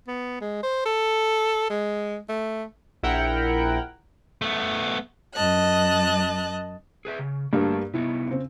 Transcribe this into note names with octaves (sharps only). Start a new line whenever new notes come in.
B3
G#3
C5
A4
G#3
A3
A#1 E4 A#4 F#5 G5
A3 B3
F#2 D#5 A5 F#6
G#4 B4 E5
C#3
G2 A3 A#3 D4 F#4
C3 B3 D#4 E4
C#3 C4